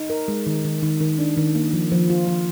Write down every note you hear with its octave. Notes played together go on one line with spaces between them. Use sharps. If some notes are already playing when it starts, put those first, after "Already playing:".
Already playing: D#4
A#4
G#3
D#3
D#3
D#3
D#3
D4
D#3
A#3
F3
F3
F4
F3